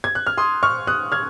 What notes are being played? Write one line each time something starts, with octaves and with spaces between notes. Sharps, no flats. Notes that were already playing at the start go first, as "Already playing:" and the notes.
G#6
F#6
F6
C6 D#6
C#6 F6
D#6 F#6
F6 G#6